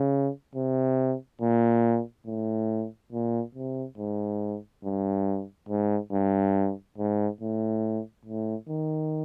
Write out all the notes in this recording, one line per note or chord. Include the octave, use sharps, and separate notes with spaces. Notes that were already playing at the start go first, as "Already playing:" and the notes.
Already playing: C#3
C3
A#2
A2
A#2
C3
G#2
G2
G#2
G2
G#2
A2
A2
D#3